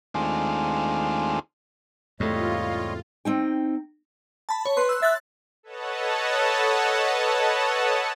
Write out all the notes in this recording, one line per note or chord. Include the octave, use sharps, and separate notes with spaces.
D#2 G#3 A3 C4 D4 F4
E2 G#2 C3 G3 A3 F4 C#5 D#5
C4 D#4 G5
A5 B5
C#5
B4 C6
E6 F#6
E5 F#6 A6
A4 B4 C#5 D#5 F#5 A5